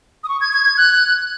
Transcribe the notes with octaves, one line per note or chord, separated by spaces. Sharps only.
D#6
C#6
G#6
G#6
G#6
F#6